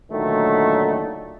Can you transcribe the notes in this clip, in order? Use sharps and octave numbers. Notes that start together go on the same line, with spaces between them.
A#2 D3 D#3 F#3 A3